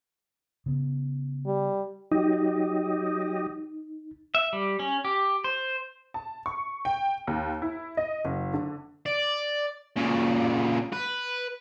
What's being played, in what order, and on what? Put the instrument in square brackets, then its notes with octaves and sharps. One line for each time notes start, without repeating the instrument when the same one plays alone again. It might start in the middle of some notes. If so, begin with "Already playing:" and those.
[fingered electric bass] C#3 B3
[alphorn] G3
[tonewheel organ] F#3 G4 D#5 [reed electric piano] D#4
[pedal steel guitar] E5
G3
C#4
G4
C5
[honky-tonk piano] A5
C#6
G5
D#2
E4
D#5
F#1
D3
[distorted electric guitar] D5
A#2 C#3
B4